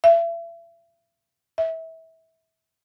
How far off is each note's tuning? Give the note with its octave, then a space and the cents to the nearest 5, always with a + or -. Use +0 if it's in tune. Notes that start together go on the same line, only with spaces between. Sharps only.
E5 +35
E5 -25